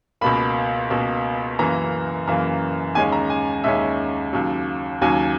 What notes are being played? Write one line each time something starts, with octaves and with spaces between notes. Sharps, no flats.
C#2 B2 A#3 B5
C#2 B2 A#3
F#2 C#3 E3 A#3 A#5
F#2 C#3 E3 A#3
D#2 C#3 G#3 C#4 G#5
A#5
G#5
D#2 C#3 G#3 C#4 E5
D#2 C#3 F#3
D#2 C#3 F#3 G#5